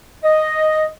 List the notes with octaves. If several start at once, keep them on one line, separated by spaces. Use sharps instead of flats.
D#5